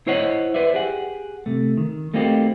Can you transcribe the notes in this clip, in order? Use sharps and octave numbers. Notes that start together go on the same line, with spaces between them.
E4 C5 C#5 D#5 F#5
B4 C5 D5 E5
G4 G#4 F#5
C3 A3
D#3
A3 A#3 C4 D#4 F#4 G4